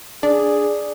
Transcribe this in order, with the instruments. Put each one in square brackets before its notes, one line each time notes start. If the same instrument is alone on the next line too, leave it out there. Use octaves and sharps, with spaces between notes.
[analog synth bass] D4 [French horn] G#4 [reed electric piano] D5